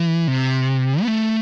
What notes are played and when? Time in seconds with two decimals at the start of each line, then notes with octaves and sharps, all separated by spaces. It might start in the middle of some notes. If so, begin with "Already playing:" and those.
Already playing: E3
0.28 C3
1.02 B3
1.08 A3